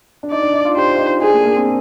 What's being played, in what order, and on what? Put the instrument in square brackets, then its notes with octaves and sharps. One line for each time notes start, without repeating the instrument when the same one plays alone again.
[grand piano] D4
[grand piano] D#4 [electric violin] D5
[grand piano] D4
D#4
F4
[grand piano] G4 [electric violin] C5
[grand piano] F4
D#4
[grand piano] D4 [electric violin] G#4
[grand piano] A#3
A#3
C4